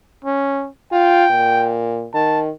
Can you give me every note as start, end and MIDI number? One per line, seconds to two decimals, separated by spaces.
0.25 0.69 61
0.92 1.25 65
0.92 1.75 79
1.30 2.06 46
2.14 2.49 51
2.14 2.41 81